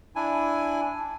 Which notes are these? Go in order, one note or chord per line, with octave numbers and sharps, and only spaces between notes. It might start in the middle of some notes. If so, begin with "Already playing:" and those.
D4 E4 G#5